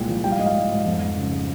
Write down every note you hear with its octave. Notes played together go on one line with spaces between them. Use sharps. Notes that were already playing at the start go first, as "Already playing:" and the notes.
Already playing: C2 A#2 G#3 G5
F3
G3 G5
F5
G#2 D#5
F5
G3
G#2
F2
F2
C#3
G#3